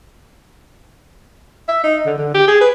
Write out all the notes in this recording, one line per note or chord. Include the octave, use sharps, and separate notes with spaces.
E5
D#4
D3
D3
G4
G#4
B4